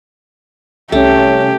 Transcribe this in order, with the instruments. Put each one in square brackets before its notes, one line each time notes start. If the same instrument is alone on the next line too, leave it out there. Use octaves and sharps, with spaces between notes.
[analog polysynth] C2 C#4 [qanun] A3 [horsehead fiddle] G4